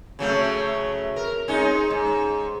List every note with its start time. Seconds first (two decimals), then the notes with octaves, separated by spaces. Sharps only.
0.19 C#3 F#3 A3
1.16 A#4
1.48 G#3 C#4 D#4
1.90 G#2